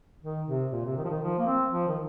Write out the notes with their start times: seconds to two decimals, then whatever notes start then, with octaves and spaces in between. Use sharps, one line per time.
0.23 D#3
0.47 C3
0.72 A#2
0.85 C3
0.97 D#3
1.04 F3
1.09 D#3
1.22 F3
1.38 A#3
1.46 C4
1.71 F3
1.88 D#3